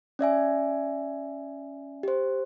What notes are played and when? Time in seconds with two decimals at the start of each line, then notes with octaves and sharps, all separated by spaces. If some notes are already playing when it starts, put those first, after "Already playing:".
0.19 C#4 D5 E5 G#5
2.03 G4 C5